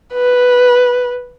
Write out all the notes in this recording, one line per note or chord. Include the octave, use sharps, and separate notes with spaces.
B4